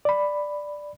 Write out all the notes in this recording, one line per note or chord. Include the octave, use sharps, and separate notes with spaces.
D5 B5